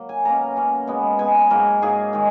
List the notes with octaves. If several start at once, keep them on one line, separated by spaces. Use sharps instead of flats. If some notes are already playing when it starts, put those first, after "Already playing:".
Already playing: F#3 A#3
G#5
B2 A#3 C#4 A#5
B2 A#3 C#4
B2 G#3 B3
B2 G#3 B3 G#5
G#2 F#3 A#3 A#4
G#2 F#3 A#3 G#4
D#3 G#3